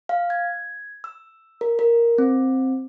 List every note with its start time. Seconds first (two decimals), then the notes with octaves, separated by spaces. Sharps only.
0.09 F5
0.30 G#6
1.04 E6
1.61 A#4
1.79 A#4
2.18 C4